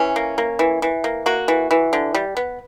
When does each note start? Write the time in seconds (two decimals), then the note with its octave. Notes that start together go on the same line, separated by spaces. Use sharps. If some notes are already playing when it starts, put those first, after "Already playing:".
Already playing: E3 C#4
0.16 A#3
0.38 A#3
0.59 E3
0.82 E3
1.04 A#3
1.26 A#3 F#4
1.48 E3
1.71 E3
1.93 D3
2.15 G3
2.37 B3